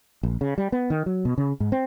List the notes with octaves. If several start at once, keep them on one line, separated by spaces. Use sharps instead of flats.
A#1
C#3
G3
B3
D#3
F#3
B2
C#3
G#2
C4